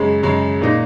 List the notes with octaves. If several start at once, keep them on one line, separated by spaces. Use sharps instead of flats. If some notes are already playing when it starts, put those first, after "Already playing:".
Already playing: F#2 C#3 G#3
F#2 C#3 G#3
A#2 A#3 D#4